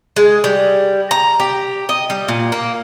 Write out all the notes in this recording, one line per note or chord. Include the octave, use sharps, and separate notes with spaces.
G#3
G3
A#5
G4
D#5
G3
A#2
A#3